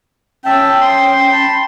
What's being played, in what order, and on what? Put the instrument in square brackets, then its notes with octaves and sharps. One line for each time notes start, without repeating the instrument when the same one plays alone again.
[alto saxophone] C#4 [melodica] E5 A5 [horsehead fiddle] G5
[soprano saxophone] C6 [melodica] D#6
[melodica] A5 B5